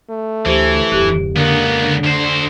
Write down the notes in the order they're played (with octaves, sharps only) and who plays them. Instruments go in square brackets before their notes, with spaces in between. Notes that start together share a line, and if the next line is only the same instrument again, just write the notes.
[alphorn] A3
[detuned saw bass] D2 [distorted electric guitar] E3 [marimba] G4 C5
[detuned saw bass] D1 [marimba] F2 G4 F#6
[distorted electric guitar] C#2 B3 [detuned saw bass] D3 [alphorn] A#3
[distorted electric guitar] D2 C5 [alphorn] D4